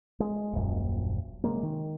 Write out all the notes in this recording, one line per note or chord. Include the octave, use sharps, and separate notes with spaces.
G#3
D#1 A#1 F#2
C3 F#3 G#3 A#3
D#3